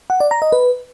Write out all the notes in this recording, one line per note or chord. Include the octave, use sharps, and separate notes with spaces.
F#5
D5
A#5
D#5
B4